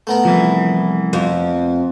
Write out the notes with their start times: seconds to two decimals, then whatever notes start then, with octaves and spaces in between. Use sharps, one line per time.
0.07 A3 B3 A#4
0.25 C2 E3 F3
1.13 F2